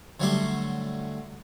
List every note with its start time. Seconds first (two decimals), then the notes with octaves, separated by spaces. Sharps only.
0.20 D3 F#3 G3 A3 C6 D6